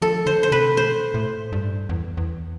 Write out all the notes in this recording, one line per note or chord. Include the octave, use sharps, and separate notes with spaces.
F3 A4
D3 C5
C5
C3 B4
B2 C5
A2
G2
E2
E2